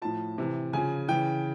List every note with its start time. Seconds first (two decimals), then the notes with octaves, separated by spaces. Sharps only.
0.02 A2 F3 A5
0.38 C3 E3
0.73 C#3 F3 G#5
1.08 C#3 E3 G5